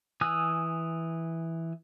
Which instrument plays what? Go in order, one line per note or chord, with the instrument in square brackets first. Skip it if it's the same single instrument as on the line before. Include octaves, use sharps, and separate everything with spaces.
[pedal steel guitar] E3 G#5 D#6 E6 F#6